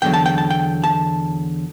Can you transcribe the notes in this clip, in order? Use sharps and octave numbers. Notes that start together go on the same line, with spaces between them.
E2 D3 F#3 G5
A5
G5
A5
G5
A5